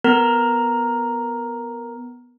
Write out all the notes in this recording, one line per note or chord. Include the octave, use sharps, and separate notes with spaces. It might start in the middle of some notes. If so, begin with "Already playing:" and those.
B3 A#4 A#5